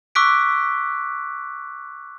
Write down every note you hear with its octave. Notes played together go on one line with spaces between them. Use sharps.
C#6 D6 E6 F#6 B6 D7